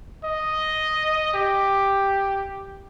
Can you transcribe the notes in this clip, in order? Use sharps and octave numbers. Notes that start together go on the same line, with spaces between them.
D#5
G4